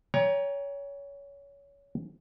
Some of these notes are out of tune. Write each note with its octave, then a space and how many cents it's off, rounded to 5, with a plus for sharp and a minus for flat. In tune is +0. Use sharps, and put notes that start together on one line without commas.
C#5 +20 G5 +45 A#5 +25